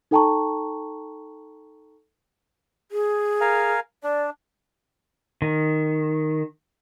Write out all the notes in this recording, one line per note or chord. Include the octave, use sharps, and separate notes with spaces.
D#4 A4 G5 A5 A#5 C#6
G#4
A#4 F5 G#5
D4 D5
D#3